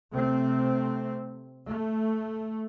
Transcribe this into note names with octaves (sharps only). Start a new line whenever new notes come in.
C3 A3 C4
A3